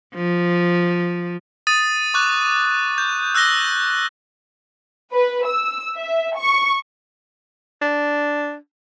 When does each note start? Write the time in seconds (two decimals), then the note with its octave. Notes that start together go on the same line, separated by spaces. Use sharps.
0.15 F3
1.67 D#6 A6 D#7
2.14 C#6 D6 F#6
2.98 G6
3.35 E6 F#6 G6 A#6 G7
5.12 B4
5.46 E6
5.97 E5
6.37 C#6
7.82 D4